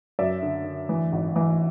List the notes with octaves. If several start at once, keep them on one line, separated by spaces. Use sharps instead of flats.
F#2 D5 E5
D3
D3
E3
G#1
E3